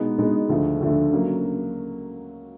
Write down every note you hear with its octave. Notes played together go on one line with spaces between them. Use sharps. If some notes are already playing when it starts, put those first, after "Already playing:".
Already playing: B2 G#3 B3 D#4
B2 G#3 B3 D#4
D2 D3 F3 A3
D2 D3 F3 A3
C#3 F#3 A#3